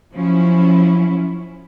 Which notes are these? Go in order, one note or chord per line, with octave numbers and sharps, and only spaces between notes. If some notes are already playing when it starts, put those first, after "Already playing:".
F3 F#3 C#4 E4